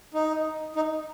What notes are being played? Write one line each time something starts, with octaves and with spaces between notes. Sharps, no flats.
D#4
D#4